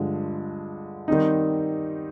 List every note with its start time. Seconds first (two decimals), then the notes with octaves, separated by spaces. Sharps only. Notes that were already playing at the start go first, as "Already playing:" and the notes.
Already playing: G2 D3 F3 G#3
1.08 D#3 G3 C4 D#4